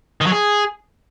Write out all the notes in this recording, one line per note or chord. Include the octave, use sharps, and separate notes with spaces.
D#3
F#3
G#4